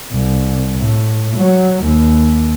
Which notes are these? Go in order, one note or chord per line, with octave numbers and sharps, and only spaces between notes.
C2
A2
F#3
D#2